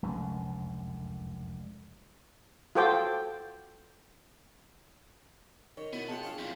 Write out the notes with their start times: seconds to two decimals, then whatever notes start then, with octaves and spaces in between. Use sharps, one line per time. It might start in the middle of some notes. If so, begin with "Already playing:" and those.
0.03 F1 C#2 F#2 D3
2.75 F4 F#4 A4 C5 G5 D6
5.77 D#3 C#5
5.93 B2 B3 E4
6.09 G#3 F4 G#4 F#5 G5 A5
6.23 C#4 D4 F5
6.38 F2 A#2 E4 F4